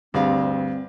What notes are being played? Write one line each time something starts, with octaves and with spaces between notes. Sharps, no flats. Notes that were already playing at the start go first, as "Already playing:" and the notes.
D2 G2 G3 C4 G#4 D5 F5